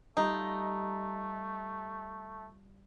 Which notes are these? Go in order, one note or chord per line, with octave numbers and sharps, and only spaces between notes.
G3 A3 D#4 F4 G4